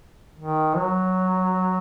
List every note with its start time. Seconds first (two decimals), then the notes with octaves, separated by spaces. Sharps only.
0.39 D#3
0.75 F#3